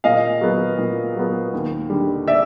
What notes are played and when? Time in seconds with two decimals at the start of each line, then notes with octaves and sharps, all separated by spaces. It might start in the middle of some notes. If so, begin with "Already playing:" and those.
0.04 A#2 D#5 F5
0.41 F#3 B3
0.78 A#2
1.16 F#3 B3
1.53 D#2
1.90 D3 G3
2.28 D5 E5